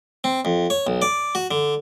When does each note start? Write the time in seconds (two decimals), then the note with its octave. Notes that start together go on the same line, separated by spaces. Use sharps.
0.24 C4
0.45 F2
0.70 C#5
0.87 B1
1.02 D5
1.35 F#4
1.51 D3